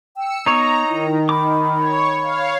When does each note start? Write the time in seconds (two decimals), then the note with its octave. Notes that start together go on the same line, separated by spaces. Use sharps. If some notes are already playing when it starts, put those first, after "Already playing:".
0.16 G5 E6 C#7
0.46 B3 D#4 C#5 A#5
0.89 D#3 E4
1.29 B5 D6
1.78 C#5
2.23 C#5 F5